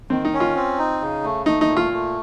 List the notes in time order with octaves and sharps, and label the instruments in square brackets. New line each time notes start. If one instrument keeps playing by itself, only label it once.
[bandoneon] D#3 [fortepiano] C4
[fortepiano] D#4
[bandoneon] C#4
[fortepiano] F4
[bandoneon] C4
D#4
C#3
A3
[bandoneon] A3 [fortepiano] D#4
[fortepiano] D#4
[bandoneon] A#2
[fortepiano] F4
[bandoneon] A3